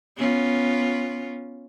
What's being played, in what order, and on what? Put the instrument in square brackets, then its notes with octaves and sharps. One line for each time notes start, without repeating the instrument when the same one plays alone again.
[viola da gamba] B3 C#4 F4